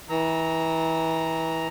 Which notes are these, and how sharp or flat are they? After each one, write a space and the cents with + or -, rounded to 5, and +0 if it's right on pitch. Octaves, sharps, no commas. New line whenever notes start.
E3 -25 A#5 +0 E6 -30